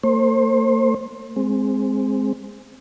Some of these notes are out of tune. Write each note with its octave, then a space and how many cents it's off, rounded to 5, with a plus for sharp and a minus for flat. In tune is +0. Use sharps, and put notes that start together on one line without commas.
A#3 -45 C5 +30
G#3 +0 C4 +0